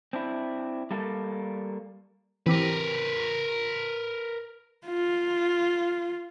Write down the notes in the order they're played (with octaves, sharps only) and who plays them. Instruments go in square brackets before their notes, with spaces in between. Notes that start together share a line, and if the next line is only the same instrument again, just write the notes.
[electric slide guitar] C4 D4 E4
G3 A#3 A4
[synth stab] E3 C4 G4 [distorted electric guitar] A#4 B4
[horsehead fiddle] F4